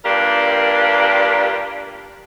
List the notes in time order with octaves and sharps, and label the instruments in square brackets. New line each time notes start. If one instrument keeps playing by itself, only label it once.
[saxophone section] G2 A#3 D4 F4 G4 A#4